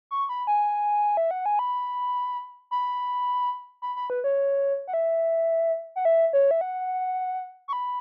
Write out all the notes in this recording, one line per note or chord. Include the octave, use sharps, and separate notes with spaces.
C#6
B5
G#5
E5
F#5
G#5
B5
B5
B5
B5
B4
C#5
F#5
E5
F#5
E5
C#5
E5
F#5
C#6
B5